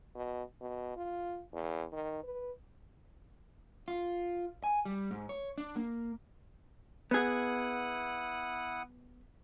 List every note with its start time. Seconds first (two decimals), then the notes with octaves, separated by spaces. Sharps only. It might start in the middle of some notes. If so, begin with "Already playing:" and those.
0.15 B2
0.61 B2
0.97 F4
1.54 E2
1.93 D#3
2.24 B4
3.88 F4
4.64 G#5
4.85 G3
5.11 G#2
5.29 C#5
5.58 D4
5.76 A#3
7.11 B3 E4 G#4 F#5 D#6